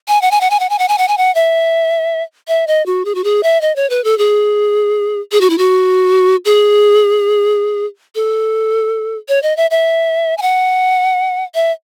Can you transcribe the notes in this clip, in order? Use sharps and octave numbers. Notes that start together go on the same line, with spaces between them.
G#5
F#5
G#5
F#5
G#5
F#5
G#5
F#5
G#5
F#5
G#5
F#5
E5
E5
D#5
F#4
G#4
F#4
G#4
E5
D#5
C#5
B4
A4
G#4
G#4
F#4
E4
F#4
G#4
A4
C#5
D#5
E5
E5
G#5
F#5
E5